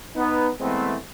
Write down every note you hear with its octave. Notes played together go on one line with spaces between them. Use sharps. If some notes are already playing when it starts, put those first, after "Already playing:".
B3 D#4
E3 G#3 A3 B3 C4